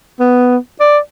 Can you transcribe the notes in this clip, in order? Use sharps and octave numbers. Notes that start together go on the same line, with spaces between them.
B3
D5